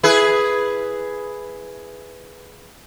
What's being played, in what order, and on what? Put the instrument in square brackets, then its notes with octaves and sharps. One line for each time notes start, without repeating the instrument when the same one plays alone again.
[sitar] E4 G#4 B4